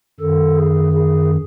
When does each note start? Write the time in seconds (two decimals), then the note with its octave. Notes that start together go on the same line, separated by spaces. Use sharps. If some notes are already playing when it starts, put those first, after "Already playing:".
0.20 F#2 D#3 A4
0.57 G#4
0.93 G#4